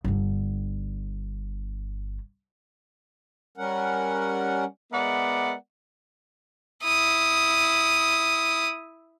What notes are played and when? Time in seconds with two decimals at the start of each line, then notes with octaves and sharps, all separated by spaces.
0.04 G1 D3
3.57 G3 C#4 A#4 F#5
4.92 G#3 B3 A#4 D5 E5 F#5
6.84 E4 D#6